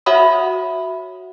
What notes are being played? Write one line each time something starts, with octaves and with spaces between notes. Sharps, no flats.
F#4 C#5 E5 F#5 B5 D#6